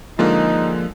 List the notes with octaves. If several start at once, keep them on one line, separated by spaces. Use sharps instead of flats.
D3 F3 G#3 A#3 D#4 F4